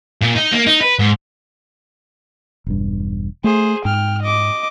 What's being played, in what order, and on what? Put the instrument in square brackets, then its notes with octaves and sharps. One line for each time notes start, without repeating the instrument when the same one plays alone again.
[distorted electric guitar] A#2
D#4
A#3
D#4
B4
G#2
[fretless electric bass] E1 G2
[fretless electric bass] A3 [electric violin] G#4 C5
[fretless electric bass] G#2 [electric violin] G5 F6
[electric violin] D#5 D6